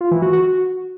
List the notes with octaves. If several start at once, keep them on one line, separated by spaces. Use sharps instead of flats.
F4
E3
F#4
F#4